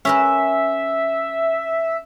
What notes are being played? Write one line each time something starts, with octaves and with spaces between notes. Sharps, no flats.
C#4 A#4 B4 E5